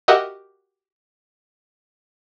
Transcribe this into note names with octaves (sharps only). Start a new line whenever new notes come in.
F#4 G4 A#4 D#5 E5 F#5